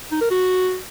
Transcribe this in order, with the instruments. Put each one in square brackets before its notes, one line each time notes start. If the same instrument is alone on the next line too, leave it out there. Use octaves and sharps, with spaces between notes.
[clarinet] D#4
A#4
F#4